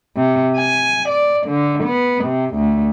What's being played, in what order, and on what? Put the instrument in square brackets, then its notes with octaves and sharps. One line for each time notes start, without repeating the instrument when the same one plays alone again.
[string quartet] C3
G#5
D5
D3
B3
C3
D2